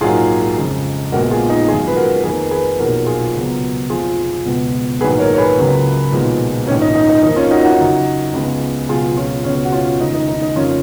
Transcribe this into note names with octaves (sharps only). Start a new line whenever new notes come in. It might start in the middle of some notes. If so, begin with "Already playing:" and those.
A#1 G#2 F#3 A#3 F4 G#4
F2 C#3 G#3
A#1 A#2 G#3 B3 F#4 A#4
F4 G#4
D#4
G#1 F#2 F3 G#3 F4 G#4
B4
F#4 A#4
F2 D#3 A#3 G#4 B4
G#4 B4
B1 A#2 F3 A#3 F#4 A#4
F4 G#4
C#2 B2 F#3 B3
F1 F2 F3 F4 G#4
C#2 B2 G#3 B3
A#1 G#2 D#3 F#3 G#4 B4
A#4 C#5
C#5
G#4 B4
C#2 C#3 F#3 A#3
B1 A#2 F3 G#3 B3
A#1 G#2 D#3 C#4
D#4
D#4
D#4
F2 F3 A#3 D#4
C#4 F4
D#4 F#4
D#4 F#4
F#2 C#3 F#3
C#2 C#3 G#3 B3
C#2 B2 F#3 F4 G#4
C#4 F4
C#2 B2 G#3 B3 C#4
F#4
C#4 F4
F1 D#2 C#3 G#3 D#4
D#4
D#4
D#4
F1 F2 C#3 F3 A#3 C#4 F4